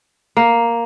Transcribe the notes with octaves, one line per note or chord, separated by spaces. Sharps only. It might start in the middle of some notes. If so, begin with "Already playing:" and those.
A#3